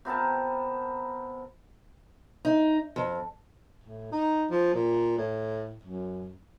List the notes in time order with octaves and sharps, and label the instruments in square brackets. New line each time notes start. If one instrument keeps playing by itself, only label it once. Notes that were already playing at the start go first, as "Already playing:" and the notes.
[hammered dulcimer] C3 B3 A#4 A5
[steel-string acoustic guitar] D#4
F2
[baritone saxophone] A2
D#4
F3
A#2
A2
F#2